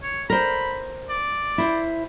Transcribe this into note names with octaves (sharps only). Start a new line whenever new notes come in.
C#5
A#4 C5 B5
D5
E4 C5